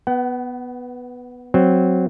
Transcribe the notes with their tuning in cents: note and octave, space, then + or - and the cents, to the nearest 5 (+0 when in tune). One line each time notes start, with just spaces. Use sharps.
B3 +0 F#5 +35
F#3 +0 C4 -5